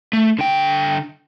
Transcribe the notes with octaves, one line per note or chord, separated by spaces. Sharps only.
A3
D3 G5